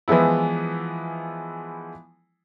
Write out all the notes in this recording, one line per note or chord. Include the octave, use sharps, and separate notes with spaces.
E3 F3 G#3 B3 E4